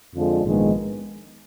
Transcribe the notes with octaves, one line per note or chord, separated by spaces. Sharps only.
F2 D3 F3 G#3
A#1 G#2 D#3 G#3 B3